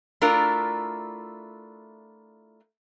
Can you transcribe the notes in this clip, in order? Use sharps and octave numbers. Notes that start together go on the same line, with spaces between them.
A3 D4 E4 F4 A#4